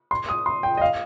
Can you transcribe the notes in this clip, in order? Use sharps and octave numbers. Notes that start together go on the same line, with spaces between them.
C6
D#6
C6
G5
D#5
F5